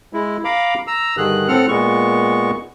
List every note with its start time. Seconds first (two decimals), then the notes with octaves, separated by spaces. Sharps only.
0.13 G#3 E4
0.44 F5 A#5 B5 D6
0.87 A#5 E6
1.17 G2 D3 D#3 G#4 F#6
1.48 A2 C4 A4 F#5 F6
1.69 A#2 G#3 B3 C#6